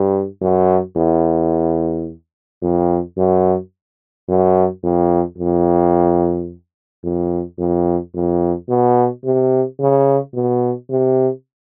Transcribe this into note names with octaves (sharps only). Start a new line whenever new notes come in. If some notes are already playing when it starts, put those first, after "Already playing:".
Already playing: G2
F#2
E2
F2
F#2
F#2
F2
F2
F2
F2
F2
B2
C3
C#3
B2
C3